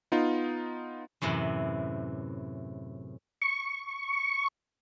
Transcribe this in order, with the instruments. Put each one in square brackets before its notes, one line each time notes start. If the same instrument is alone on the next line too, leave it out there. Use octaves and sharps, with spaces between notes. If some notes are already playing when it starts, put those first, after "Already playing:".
[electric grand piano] B3 D#4 F4
[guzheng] F#2 A2 C3 E3
[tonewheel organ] C#6